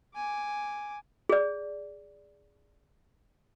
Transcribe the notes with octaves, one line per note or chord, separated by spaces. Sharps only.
G#5 D6
G#4 D5